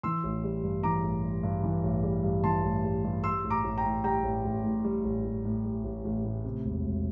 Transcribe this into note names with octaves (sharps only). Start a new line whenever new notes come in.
E3 C6 E6
A1
G3
G2
E3 A#5 D6
A1
G3
G2
E3
A1
G3
G2
E3 A5 C6
A1
G3
G2
G3 C6 E6
A1
A#5 D6
A1
G5 A#5
A2
G3 G5 A#5
A1
A1
A2
G3
A1
A1
A2
G3
A1
A1
A2
C3
E1
E1